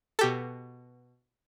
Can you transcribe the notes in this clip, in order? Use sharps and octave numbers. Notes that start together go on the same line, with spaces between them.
B2 G4 A4